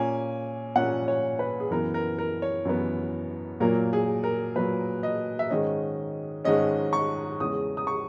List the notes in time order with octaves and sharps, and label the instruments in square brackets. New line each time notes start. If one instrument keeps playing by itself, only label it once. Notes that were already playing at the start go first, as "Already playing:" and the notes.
Already playing: [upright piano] A#2 A#3 C#4 G#5
A#2 A#3 C#4 F#5
C#5
B4
G#4
F#2 E3 B3 A#4
A#4
A#4
C#5
F#2 E3 B3
A#2 F#3 A#3 A#4
G#4
A#4
A#2 F#3 A#3 B4
D#5
E5
G#2 D#3 G#3 C#4 D#5
G#2 D#3 G#3 C#4 D#5
C#6
E2 C#3 G#3 C#4 D#6
D#6
C#6